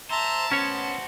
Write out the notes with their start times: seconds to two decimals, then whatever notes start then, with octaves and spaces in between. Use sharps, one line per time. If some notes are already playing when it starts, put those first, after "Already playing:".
0.10 C5 E5 A5 A#5
0.51 B3 C#4 F#4 C5 C#5